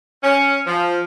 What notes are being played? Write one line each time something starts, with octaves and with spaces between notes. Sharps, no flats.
C#4
F3